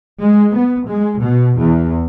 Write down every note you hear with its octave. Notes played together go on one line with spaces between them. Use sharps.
G#3
B3
G#3
B2
E2